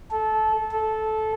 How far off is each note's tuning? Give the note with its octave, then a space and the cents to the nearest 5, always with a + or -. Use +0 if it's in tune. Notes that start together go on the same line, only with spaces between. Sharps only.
A4 -20
A4 -15